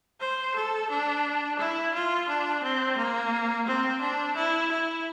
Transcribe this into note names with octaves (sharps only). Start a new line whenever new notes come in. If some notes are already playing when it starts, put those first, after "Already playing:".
C5
A4
D4
E4
F4
D4
C4
A#3
C4
D4
E4
E4